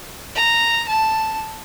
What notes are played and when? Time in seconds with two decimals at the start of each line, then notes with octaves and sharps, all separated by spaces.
0.36 A#5
0.89 A5